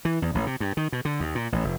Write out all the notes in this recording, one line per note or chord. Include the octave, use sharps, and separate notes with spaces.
E3
E2
A1
C3
G2
D#3
B2
D3
D#2
A#2
A1
F1